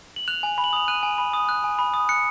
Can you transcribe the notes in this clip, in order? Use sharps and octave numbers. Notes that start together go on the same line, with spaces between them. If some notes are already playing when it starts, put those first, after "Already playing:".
F#7
F#6 F7
G#5
B5
F#7
D#6 F7
F#6 D#7
G#5
B5
D#6
F#6
G#5
B5
D#6
F#6 C#7